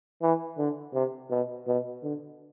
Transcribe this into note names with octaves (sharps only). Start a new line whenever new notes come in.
E3
D3
C3
B2
B2
D3